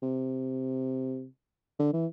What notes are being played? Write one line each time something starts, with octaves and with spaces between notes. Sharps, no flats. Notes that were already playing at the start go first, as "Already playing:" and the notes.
C3
D3
E3